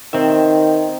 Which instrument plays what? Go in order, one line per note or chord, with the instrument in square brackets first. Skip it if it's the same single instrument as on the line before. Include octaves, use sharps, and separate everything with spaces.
[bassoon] D#3 [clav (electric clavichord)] C4 E5